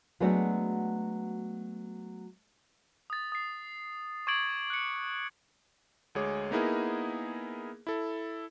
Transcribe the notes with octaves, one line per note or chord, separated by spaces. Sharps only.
F#3 G#3 A3 B3 D4 F#4
D#6 A6
D#6 C7
C#6 D6 G#6 A6 D7 F#7
F#6 C#7
D2 G#3 G#4 C#5 D6
A#3 B3 D#4 E4 G#4 A#4
E4 A4